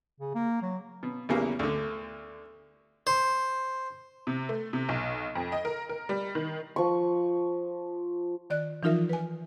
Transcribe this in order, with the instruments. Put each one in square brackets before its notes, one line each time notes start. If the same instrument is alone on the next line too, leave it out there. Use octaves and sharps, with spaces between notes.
[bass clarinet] C#3
A#3
F#3
[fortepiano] B2
B1 E2 C#3 E3 G3 A#3
D2 D3
[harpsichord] C5
[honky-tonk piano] C3
A3
C3
B1
F2
D#5
A#4
A#4
G3
D#3
[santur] F3 C#6
[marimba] D#3 D5 F#6
E3 F3 D#4 F4 A#4 E5
B4 G#5